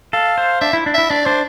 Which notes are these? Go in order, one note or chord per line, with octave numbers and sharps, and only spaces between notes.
A4 F5
C5
D4 E5
E4
D4
E4 E5
D4 D5
D4 C5